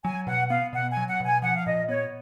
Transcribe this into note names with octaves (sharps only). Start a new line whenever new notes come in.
F#3 G#5
B2 F#5
B3 F5
B2 F#5
G#5
F#3
F#5
B2
G#5
F3 F#5
F5
A#2 D#5
B3 C#5